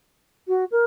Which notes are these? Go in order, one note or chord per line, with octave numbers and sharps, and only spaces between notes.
F#4
A#4